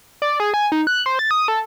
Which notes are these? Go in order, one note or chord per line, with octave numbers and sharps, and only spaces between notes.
D5
G#4
G#5
D#4
F#6
C5
A6
D#6
A4